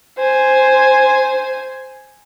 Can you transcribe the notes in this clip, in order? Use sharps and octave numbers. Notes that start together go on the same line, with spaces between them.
C5 G#5